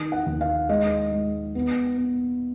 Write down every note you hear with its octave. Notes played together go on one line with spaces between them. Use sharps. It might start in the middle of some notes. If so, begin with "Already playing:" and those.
Already playing: D#3
F#5
D#2
F5
G#3 D#5
G#3
B3
B3